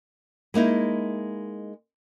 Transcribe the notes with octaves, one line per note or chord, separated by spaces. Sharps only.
G#3 A#3 D#4 E4